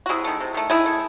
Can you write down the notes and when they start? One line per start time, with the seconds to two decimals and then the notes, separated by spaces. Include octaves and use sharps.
0.06 F#4
0.09 C3 E4 G#4
0.24 D#3 A3
0.40 C3
0.54 D#3 A3
0.70 D#3 E4 G#4
0.86 A3